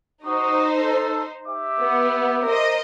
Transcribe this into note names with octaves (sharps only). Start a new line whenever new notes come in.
D#4 F#4 C5 C#6 D#6
A4
G4 E5 D6
B3
A#4 C5 D#5